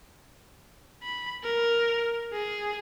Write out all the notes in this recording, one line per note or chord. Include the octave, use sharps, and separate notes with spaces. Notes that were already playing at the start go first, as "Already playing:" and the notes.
B5
A#4
G#4